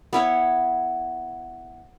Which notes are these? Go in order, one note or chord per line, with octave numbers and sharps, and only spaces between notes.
B3 E4 C#5